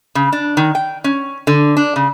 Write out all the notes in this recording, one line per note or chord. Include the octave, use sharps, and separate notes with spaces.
C#3
D4
D#3
G5
C#4
D3
D4
C#3